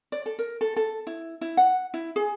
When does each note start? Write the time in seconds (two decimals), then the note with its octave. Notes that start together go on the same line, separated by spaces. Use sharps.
0.12 D5
0.26 A4
0.39 A#4
0.61 A4
0.77 A4
1.07 E4
1.41 E4
1.57 F#5
1.94 E4
2.16 G#4